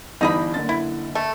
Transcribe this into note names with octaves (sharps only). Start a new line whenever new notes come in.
G1 E3 D#4 D#5 B5 A#6
F#1 D3 A6
E4
A3